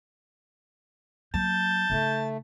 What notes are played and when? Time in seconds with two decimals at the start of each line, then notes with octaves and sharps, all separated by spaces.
1.34 F#3 A#3 A5 G6
1.90 C#3 A3 D#4